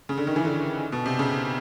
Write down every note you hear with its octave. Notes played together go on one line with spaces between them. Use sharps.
C#3
D3
D#3
E3
D3
B2
C3
C#3